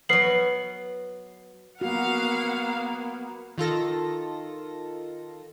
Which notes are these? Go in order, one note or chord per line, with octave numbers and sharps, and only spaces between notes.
F#3 B3 B4 C7 F#7
A#3 B3 F#4 F5 F#5
D#3 F4 A4 A#6